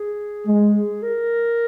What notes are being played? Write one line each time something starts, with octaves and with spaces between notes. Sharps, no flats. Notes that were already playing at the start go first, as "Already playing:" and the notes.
Already playing: G#4
G#3
A#4